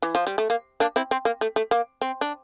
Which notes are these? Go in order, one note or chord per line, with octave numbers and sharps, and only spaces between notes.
E3
F3
G3
A3
A#3
A#3 D4
C4 E4
C4
A#3
A3
A3
A#3
C4
D4